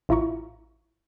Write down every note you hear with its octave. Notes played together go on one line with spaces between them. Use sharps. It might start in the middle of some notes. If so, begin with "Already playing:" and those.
A1 E4 F4 A#5 C#6